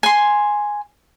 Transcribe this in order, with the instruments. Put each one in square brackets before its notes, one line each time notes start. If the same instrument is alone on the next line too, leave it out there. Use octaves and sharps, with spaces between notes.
[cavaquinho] G#5 C6